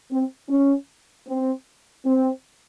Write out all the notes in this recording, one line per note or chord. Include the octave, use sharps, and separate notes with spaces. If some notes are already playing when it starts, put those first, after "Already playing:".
C4
C#4
C4
C4